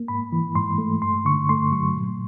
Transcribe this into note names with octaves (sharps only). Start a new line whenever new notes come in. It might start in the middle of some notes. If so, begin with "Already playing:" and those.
Already playing: A#3
G#2 B5
E3
G#2 C6
A3
G2 C6
D3 C#6
A3 C6
F#3 C#6
A#2